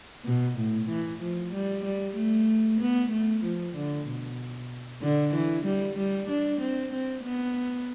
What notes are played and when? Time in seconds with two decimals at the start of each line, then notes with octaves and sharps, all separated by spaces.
0.25 B2
0.58 A2
0.88 E3
1.21 F3
1.53 G3
1.84 G3
2.16 A3
2.80 B3
3.11 A3
3.43 F3
3.76 D3
4.06 B2
5.02 D3
5.34 E3
5.65 G3
5.97 G3
6.29 D4
6.60 C4
6.92 C4
7.24 B3